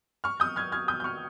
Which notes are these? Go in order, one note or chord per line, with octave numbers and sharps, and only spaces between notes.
C#6 F6
D#6 G6
F6 G#6
F6 G#6
D#6 G6
G6
C#6 F6